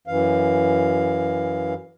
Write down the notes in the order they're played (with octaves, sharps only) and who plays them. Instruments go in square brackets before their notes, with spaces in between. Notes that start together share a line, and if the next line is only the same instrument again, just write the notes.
[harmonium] F#2 E3 F5